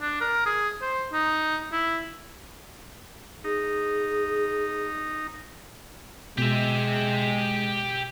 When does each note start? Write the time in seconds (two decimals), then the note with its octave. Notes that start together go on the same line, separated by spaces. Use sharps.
0.01 D4
0.21 A#4
0.46 G#4
0.82 C5
1.13 D#4
1.72 E4
3.44 D#4 G#4
6.38 B2 G#3 G4 E5